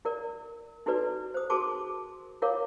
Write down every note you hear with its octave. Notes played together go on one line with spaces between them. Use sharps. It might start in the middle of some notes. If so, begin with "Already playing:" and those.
E4 A#4 D5
D#4 E4 F#4 A4 B4 D5
C5 D#6
F#4 G#4 A#4 A5 C6 D6
E4 F4 A#4 C#5 F5 D6